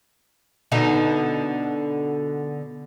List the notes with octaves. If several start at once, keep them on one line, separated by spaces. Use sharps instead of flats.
B2 D3 D#4